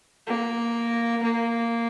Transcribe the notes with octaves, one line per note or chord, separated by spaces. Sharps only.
A#3
A#3